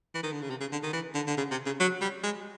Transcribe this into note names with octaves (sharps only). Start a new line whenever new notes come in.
E3
D#3
D3
C#3
C3
C#3
D3
D#3
E3
D3
D3
C#3
C3
C#3
F#3
G3
G#3